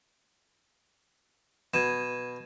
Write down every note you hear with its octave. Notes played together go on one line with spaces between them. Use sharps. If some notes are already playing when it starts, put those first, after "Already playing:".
B2 G#6 D#7 E7